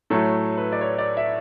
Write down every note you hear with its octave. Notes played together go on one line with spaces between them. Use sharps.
A2 F#3 A3 A4
B4
D5
C#5
D5
E5